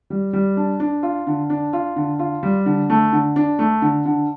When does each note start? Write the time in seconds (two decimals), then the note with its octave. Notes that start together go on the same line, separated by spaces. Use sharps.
0.10 G3
0.33 G3
0.57 D4
0.80 D4
1.03 F4
1.27 D3
1.50 D4
1.73 F4
1.96 D3
2.19 F4
2.43 G3
2.66 D3
2.90 A3
3.13 D3
3.36 D4
3.59 A3
3.82 D3
4.05 D3